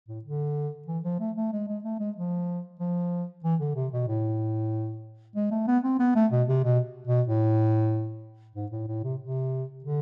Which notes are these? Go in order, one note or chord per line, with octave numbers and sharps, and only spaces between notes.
A2
D3
E3
F3
A3
A3
G#3
G#3
A3
G#3
F3
F3
E3
D3
C3
B2
A2
G#3
A3
B3
C4
B3
A3
B2
C3
B2
B2
A2
G#2
A2
A2
C3
C3
D3